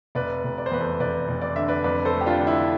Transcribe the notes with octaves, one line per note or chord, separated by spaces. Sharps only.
F1 B4 D5
F1
D5
C5
E2 B4
A4 C5
F1 B4 D5
F1
D5
D3 E5
B4 D5
F2 B4 D5
A4 C5
A3
G4
D4 F4
D3
E4